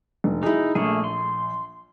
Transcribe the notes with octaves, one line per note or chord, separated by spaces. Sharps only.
F1
D#4 E4 G#4
A#1 A3 A#3 G#4
C6